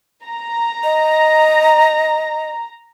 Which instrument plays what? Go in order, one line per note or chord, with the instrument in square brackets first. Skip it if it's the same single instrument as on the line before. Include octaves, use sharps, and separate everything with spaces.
[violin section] A#5
[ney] D#5